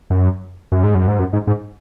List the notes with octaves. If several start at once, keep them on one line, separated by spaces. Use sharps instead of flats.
F#2
F#2
G#2
F#2
G#2
F#2
G#2
G#2